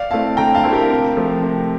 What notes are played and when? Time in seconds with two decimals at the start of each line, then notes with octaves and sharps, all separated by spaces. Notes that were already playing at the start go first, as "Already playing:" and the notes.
Already playing: D5 F5
0.11 A3 C4 E4 F5 A5
0.37 D3 G5 A#5
0.55 F5 A5
0.64 A3 C4 E4
0.72 G4 A#4
0.90 C3
1.17 F3 A3
1.43 C3